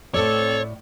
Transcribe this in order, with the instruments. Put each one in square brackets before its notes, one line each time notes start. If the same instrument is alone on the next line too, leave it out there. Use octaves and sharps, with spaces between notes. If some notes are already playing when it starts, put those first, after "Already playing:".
[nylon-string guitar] A2 D5 [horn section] C4 A4 [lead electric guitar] C#5